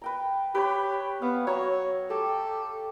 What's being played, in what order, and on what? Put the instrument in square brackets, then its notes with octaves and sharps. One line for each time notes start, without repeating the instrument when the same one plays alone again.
[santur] B4 G5 A#5
[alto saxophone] G4 [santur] B4 C#5 B5
[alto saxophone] B3 [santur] F5
[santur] F#3 A#5 [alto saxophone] C#5
[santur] G4 [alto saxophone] A4